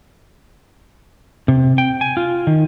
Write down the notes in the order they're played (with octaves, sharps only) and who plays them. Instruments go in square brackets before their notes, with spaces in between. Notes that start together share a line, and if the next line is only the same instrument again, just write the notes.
[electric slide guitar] C3
G5
G#5
F4
D#3